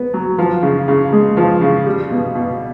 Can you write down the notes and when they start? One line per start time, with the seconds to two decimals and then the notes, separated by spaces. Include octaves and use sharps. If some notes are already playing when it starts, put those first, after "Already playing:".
Already playing: B3
0.14 F#3
0.38 F3
0.63 C#3
0.88 C#3
1.13 G#3
1.37 F3
1.61 C#3
1.86 G3
2.10 B2
2.35 B2